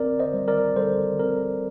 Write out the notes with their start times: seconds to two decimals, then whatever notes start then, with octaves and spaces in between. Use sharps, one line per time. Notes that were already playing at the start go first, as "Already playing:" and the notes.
Already playing: C4 A#4 D5
0.19 C5 D#5
0.34 G3
0.48 A#4 D5
0.77 G3 A4 C5
1.20 C4 A#4